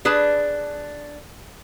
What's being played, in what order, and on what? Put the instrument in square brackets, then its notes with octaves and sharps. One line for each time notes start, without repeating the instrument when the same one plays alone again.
[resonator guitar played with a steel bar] D4 G#4 B4 A5